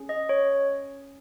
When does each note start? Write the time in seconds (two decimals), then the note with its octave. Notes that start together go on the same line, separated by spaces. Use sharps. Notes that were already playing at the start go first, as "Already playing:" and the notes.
Already playing: C#4 G#4
0.09 D#5
0.29 C#5